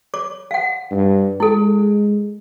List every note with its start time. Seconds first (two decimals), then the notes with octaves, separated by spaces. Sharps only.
0.14 C#5 D6
0.51 F5 F#5
0.91 G2
1.40 G#3 E4 A4